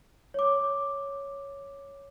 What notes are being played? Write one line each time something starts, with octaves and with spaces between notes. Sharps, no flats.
C#5 D6